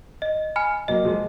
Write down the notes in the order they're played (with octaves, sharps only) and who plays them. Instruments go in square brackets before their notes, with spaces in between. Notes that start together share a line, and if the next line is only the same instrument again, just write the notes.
[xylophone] D#5
G#5 B5 F6
[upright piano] F#3 A#3 [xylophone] D#5
[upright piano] F3 G#3